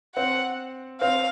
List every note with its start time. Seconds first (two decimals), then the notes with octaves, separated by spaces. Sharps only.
0.16 C4 F#5
1.01 C4 F5